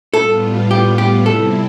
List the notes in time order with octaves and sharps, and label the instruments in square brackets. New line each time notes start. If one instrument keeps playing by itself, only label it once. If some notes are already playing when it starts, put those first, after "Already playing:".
[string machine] A2 G3 B3 F4 [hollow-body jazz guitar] A4
[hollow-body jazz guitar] G4
G4
[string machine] C3 G3 C4 E4 [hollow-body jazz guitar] A4